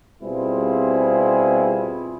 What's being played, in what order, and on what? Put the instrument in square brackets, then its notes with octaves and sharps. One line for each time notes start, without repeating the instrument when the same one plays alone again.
[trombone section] B2 G3 C4 E4 F4 G#4